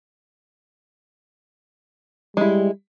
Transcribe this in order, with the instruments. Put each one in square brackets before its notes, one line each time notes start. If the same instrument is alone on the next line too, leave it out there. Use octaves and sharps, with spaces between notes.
[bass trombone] G3 [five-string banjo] G#3 E4